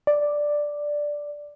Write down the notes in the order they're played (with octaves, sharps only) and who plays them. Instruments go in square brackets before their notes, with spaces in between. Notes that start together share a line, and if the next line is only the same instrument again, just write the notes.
[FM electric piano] D5